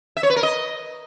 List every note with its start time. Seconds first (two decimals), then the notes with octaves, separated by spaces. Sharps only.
0.17 E5
0.23 C#5
0.30 B4
0.36 A#4
0.43 D#5